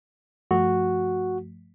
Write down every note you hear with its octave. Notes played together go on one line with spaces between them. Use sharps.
G2 F3 A3 F#4